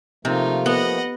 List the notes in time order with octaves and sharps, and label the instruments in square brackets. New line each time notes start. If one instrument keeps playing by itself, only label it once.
[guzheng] C3 [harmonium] F3 A3 A#3 [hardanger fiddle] D#4 F4
[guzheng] B3 [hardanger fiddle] D#5 F#5